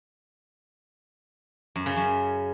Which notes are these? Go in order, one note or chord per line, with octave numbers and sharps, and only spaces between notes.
F#2
C#3
F#2